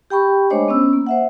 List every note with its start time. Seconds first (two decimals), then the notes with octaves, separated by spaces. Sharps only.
0.10 G4 G5 B5 C#6
0.50 G#3 A3 D4 C5 C#5 D#5
0.68 B3 C#4 E6
0.93 A#3
1.07 C5 E5 F#5